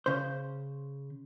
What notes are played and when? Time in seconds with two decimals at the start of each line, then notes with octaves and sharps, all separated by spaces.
0.06 C#3 C5